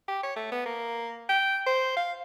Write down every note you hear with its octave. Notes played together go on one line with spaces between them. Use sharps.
G4
C#5
A3
B3
A#3
G5
C5
F5